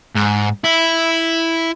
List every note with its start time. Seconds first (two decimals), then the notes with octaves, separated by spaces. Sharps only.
0.16 G#2
0.64 E4